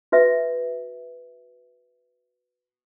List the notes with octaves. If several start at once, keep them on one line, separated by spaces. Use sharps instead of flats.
F#4 B4 E5